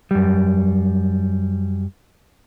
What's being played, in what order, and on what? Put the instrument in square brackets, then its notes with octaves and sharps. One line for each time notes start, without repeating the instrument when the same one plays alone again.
[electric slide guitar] F#2 G3